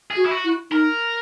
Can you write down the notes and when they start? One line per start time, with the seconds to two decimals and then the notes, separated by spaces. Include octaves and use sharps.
0.11 G#4
0.17 F#4
0.26 E4
0.31 F#4
0.45 E4
0.71 D#4 A#4